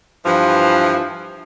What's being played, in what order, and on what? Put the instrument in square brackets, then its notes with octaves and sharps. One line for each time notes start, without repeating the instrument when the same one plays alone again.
[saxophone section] G2 E3 F3